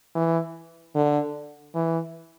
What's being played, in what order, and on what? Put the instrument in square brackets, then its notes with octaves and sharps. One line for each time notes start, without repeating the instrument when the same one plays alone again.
[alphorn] E3
D3
E3